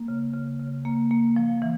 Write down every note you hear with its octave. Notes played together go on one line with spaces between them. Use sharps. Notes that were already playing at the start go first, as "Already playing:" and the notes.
Already playing: A#3
C#3
C#3
C#3
A#3
A#3
F3
E3